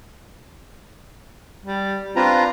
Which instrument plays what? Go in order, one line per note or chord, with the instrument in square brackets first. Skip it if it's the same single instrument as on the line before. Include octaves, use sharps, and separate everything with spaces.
[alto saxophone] G3
[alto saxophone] C4 [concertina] D4 B4 A#5 [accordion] F4